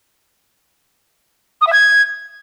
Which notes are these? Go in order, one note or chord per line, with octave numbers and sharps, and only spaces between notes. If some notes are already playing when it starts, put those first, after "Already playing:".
D#6
E5
G#6